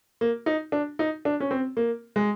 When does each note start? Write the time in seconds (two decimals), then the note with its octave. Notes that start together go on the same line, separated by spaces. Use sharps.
0.21 A#3
0.46 D#4
0.72 D4
0.99 D#4
1.25 D4
1.40 C#4
1.51 C4
1.77 A#3
2.16 G#3